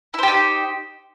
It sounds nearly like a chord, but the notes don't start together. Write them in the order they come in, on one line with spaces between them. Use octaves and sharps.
E4 C5 G4 D#4